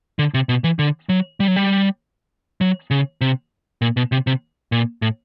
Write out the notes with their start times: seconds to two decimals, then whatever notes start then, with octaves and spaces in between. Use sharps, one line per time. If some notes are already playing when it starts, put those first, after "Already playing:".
0.19 D3
0.34 C3
0.49 B2
0.64 E3
0.79 D3
1.09 F#3
1.40 G3
1.48 F#3
1.56 G3
2.61 F#3
2.91 C#3
3.21 C3
3.82 A#2
3.97 B2
4.12 C3
4.27 C3
4.72 A#2
5.02 A2